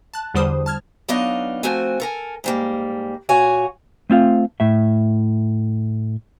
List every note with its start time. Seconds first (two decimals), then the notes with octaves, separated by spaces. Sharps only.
0.14 A5 F#6
0.34 E2 D3 G3 C5 D#6
0.66 A5 F6 G#6
1.08 F#3 B3 D4 D#4 D#5 F5
1.63 F3 A3 C4 F#4 G#5
2.00 A4 A#4 G#5
2.44 G#2 G3 A#3
3.29 A#2 F#4 C#5 G#5
4.10 A3 C4 F4 F5
4.60 A2 E5